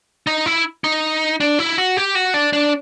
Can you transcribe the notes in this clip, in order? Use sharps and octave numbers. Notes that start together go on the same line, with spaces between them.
D#4
E4
D#4
D4
E4
F#4
G4
F#4
D4
D4